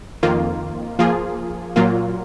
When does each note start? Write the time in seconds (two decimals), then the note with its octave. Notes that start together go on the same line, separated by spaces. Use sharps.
0.23 F2 D#3 A#3 F4
0.99 F3 A#3 F4 G#4
1.76 A#2 F#3 A#3 F4